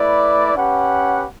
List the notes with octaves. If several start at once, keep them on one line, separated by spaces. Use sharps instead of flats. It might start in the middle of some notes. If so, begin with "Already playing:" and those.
Already playing: A3 E4 B4 D5
C#4 G4 B4 F#5